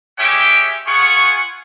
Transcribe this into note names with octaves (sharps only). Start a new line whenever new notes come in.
G#3 C#4 G4 E5 G5 D6
F4 G#4 F#5 G#5 C#6